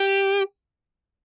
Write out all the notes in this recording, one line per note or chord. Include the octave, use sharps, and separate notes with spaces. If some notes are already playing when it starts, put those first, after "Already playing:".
Already playing: G4